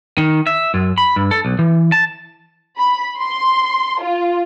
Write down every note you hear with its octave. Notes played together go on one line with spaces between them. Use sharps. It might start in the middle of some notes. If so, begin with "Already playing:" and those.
D#3
E5
F#2
B5
G2
A4
B1
E3
A5
B5
C6
F4